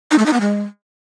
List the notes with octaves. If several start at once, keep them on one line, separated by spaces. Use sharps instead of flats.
D#4
A3
D#4
B3
G#3